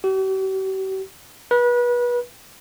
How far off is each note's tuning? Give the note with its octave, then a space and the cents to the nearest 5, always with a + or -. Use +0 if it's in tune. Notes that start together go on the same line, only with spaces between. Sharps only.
G4 -45
B4 -30